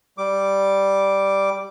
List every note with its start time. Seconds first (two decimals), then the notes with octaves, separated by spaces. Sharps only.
0.18 G3 D6